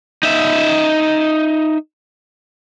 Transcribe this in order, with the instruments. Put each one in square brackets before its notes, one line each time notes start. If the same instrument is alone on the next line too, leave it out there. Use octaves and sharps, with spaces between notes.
[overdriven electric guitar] D#4 E5